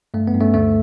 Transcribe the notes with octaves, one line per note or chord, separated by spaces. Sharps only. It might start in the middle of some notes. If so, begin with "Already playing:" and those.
G2 A3
B3
G2
A3 C#4
D2 A3